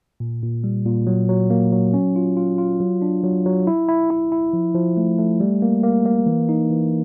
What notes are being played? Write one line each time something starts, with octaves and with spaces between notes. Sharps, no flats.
A#2
A#2
G3
A#2
F#3
F#3
A#3
F#3
C#4
F4
F4
F4
F#3
D4
F#3
F#3
E4
E4
E4
E4
F3
F3
A3
A3
G3
A#3
A#3
A#3
E3
D#4
E3